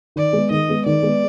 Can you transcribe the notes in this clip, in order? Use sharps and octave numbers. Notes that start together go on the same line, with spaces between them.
D#3 D5
G#3 B3
D#3 D#5
G#3 B3
D#3 D5
G#3 B3